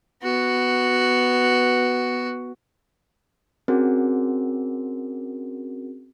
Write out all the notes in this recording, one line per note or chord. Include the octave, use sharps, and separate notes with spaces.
B3 F#4
C4 C#4 F#4 G#4 A#4